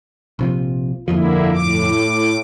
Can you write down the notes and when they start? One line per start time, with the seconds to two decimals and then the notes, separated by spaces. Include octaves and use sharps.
0.39 A#1 C3 F3
1.08 G1 F2 D3 F3 A#3 E4
1.53 A2 D6